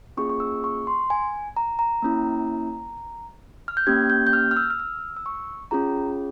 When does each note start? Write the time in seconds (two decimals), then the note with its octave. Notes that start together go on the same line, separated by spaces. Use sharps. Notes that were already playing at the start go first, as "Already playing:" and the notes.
0.17 A#3 C#4 F4 G#4 C#6
0.30 C#6
0.40 E6
0.64 C#6
0.87 C6
1.10 G#5
1.56 A#5
1.79 A#5
2.03 A#3 C#4 E4
3.68 F6
3.77 G6
3.87 A#3 C#4 G4 G#6
4.10 G6
4.27 G6
4.33 F6
4.51 F6
4.57 E6
4.70 F6
4.80 E6
5.17 E6
5.26 C#6
5.71 C#4 F4 G#4 A#5